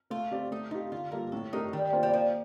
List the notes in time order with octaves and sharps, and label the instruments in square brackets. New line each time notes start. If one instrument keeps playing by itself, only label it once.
[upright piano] A3 [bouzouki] F4
[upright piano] C4 G4 D5
[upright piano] A3 [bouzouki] D#4
[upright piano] D#4 G4 [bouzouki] F4
[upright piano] D3 [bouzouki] F4
[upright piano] G3 A#3 F4 A4 [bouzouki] A#4
[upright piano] A2 [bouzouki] A4
[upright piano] A3 D4 G4 A#4 [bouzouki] D#4
[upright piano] D#3 [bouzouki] G3
[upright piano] A#3 D4 F4 C5
[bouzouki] G3
[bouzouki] F3 [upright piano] A#3